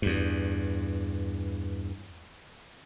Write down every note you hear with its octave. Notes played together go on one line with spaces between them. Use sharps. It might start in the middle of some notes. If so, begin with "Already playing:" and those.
E2 G2